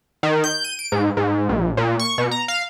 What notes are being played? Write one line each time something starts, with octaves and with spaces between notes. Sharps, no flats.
D#3
G6
D#7
D7
G#2
G#2
A#1
A#2
C#6
B2
A#5
F5